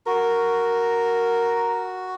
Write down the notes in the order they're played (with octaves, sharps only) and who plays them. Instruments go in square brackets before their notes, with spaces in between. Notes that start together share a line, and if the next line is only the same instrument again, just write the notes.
[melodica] F#4 [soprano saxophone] A#4